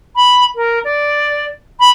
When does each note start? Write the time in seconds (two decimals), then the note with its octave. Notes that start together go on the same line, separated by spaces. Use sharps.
0.16 B5
0.56 A#4
0.84 D5
1.80 B5